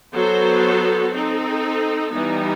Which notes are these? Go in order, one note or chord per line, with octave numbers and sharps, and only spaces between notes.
F#3 B3 F#4 A4 C5
C4 D#4 A4
E3 G3 B3 D#4